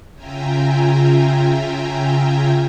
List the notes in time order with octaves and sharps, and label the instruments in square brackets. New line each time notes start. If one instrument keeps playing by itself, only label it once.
[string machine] C#3 F4 E5 G5 G#5 A#5